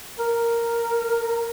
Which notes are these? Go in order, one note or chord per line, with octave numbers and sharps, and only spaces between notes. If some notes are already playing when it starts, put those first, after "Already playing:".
A#4